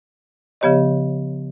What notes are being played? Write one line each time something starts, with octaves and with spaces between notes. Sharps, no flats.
C#3 F3 B3 G4 C#5 D#5